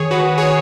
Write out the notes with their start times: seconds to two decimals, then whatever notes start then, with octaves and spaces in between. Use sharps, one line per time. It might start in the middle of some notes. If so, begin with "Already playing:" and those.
Already playing: D#3 G#4 C#5
0.11 F#4 B4
0.38 G#4 C#5